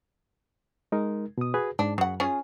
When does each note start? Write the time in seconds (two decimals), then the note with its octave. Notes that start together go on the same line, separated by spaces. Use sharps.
0.92 G#3 D#4 A#4
1.38 B2 D#6
1.54 F#4 G#4 B4
1.79 G#2 D4
1.98 F#2 C#3 F#5
2.20 C#4 F4 G#4